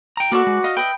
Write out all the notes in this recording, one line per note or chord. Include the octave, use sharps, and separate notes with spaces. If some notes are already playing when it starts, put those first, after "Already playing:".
G5 A#5
A#3 F#4 A4 B4 D5 C#6
G#3
D#5 F5
B4 D#5 E5 G5